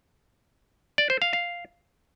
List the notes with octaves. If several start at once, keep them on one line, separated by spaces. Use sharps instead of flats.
D5
C5
F5
F5